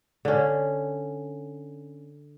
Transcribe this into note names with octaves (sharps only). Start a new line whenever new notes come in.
D3 C#4